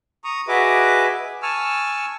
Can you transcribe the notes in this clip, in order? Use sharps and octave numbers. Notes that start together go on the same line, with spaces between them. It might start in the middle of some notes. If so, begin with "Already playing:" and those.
A#5 C#6 D#6
F#4 G#4 B4 D#5 E5 D6
G#5 A5 C#6 E6 F6